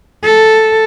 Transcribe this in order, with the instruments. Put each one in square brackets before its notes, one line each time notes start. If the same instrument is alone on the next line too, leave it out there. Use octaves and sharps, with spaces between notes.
[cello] A4